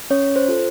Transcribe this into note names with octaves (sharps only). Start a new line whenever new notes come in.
C#4 C#5
C5
F4 A4